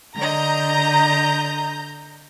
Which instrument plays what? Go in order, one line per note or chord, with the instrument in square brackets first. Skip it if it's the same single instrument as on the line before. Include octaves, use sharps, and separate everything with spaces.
[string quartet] D3 D#5 [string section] A#5 G6